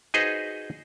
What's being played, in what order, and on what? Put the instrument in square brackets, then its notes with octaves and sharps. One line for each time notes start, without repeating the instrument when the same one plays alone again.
[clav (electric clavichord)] D#4 F#4 G#4 B4 C5 D#5